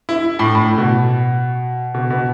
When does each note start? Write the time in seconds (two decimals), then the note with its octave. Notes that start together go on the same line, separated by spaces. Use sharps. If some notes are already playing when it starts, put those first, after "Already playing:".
0.09 E4
0.39 A2
0.55 A2
0.78 B2
1.94 B2
2.10 B2